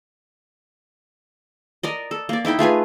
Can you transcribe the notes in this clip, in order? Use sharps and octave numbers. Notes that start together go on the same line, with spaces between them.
A#4 D5 D#5
A4
A#3 D5
D#4 E4 G5 B5
A3 F4 G#4 B4